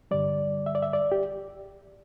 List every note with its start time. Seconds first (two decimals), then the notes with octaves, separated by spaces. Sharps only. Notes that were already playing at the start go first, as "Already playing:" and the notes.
0.11 G2 D3 G3 D5
0.66 E5
0.75 D5
0.82 E5
0.93 D5
1.12 G4